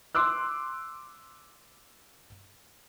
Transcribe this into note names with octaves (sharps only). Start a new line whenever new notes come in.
C6 D6 E6 F#6